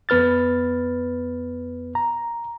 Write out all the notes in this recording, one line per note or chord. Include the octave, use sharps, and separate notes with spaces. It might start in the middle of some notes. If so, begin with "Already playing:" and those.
F2 B3 B4 F6 A6
A#5